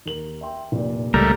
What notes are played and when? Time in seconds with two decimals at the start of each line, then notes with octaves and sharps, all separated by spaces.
0.06 D#2 A#4 F#7
0.41 E5 G5 C6
0.72 F1 A#2
1.14 C#2 G3 A3 A#4